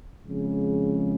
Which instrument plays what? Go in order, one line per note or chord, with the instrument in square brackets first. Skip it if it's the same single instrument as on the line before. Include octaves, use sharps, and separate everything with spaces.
[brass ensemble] F2 C#3 G#3